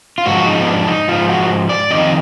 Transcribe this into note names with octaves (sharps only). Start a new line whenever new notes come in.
F4
G#2 F3 F#4
D#4
B3
D4
D#4
G#2 F3 F4
F#4
D5
F2 D#3 D#5